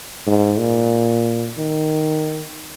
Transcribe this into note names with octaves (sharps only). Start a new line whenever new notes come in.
G#2
A#2
D#3